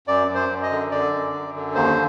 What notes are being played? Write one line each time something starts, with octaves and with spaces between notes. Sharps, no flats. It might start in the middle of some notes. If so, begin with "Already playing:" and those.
F#2 D5
F#2
C5
F#2
D#5
D3
D3 D5
F#2
F#2
D3
D#2 C5